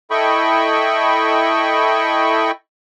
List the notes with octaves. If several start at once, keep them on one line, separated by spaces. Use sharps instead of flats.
E4 A4 D#5 G5 B5 C#6